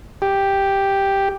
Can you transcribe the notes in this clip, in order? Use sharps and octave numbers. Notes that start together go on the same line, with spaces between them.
G4